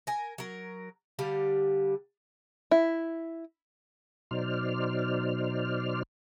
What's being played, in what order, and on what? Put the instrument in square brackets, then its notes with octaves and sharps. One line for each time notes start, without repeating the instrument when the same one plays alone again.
[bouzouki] A#4 G#5
F#3 A#4
D3 G3 G4 F5
[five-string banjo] E4
[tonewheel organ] B2 F#3 D#4 C5 D5 F6